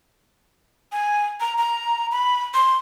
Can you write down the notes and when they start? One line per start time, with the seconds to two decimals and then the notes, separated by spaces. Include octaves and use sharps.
0.92 G#5
1.40 A#5
1.58 A#5
2.11 B5
2.54 C6